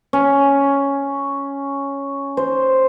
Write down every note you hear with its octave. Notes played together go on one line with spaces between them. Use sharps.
C#4
C5